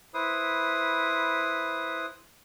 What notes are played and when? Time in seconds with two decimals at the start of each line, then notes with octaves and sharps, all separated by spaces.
0.14 E4 B4 C5 D#6